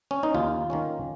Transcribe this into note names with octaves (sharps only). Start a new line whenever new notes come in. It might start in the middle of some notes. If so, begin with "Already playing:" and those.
C#4
D#4
D#2 F4
D#3 A#3 C#4